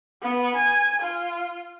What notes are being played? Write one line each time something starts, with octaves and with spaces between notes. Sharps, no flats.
B3
G#5
F4